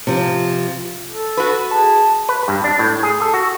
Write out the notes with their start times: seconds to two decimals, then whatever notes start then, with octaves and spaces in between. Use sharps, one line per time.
0.07 C3 F3
1.09 A4
1.37 F#4 B4
1.71 G#4 A5
2.29 B4
2.48 G2
2.64 D4
2.79 A2
3.03 G#4
3.22 A4
3.34 F#4